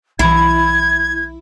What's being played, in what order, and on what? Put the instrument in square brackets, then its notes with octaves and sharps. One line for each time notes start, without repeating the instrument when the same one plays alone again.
[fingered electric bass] B1 E3 [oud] E4 [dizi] G#6